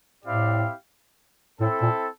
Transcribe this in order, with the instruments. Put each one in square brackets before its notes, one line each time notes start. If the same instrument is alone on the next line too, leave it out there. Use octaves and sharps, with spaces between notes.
[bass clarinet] A2 [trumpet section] C4 E4 G4 D5 F5
[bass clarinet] A2 [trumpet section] C4 E4 A4
[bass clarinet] A#2